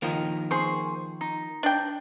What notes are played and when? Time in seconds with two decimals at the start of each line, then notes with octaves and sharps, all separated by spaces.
0.02 D#3 F3 A#3
0.51 G#4 C5 C#6
1.21 D#4
1.63 D4 G5